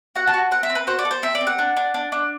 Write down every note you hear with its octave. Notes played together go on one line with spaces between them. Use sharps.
F#4 F#5
A5
F#4
C4 F#5
E5
C4
B4
F#4 C5
D5
A4
C5
C4 E5
D5
C4
F#5
D4
D4
D4
D4